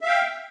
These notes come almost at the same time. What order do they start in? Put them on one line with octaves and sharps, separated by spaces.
E5 F5 G5